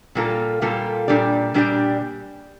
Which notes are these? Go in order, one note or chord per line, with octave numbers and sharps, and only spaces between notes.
A#2 G3 A#3 F4 A4
A#2 G3 A#3 F4 A4
A#2 G3 D4 G4 D5
A#2 G3 D4 G4 D5